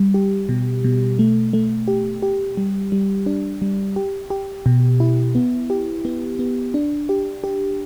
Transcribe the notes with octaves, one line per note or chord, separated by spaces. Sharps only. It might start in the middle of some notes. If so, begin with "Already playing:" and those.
Already playing: G3
G4
B2
B2
A3
A3
G4
G4
G3
G3
D4
G3
G4
G4
B2
E4
B3
G4
B3
B3
D4
G4
G4